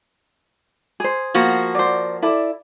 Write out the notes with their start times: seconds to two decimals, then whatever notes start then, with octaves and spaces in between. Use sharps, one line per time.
1.00 G#4 C5
1.34 F3 A#3 F#4
1.75 C5 D5
2.22 E4 A4 D5